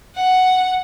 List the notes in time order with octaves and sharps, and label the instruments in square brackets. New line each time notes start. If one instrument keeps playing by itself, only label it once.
[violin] F#5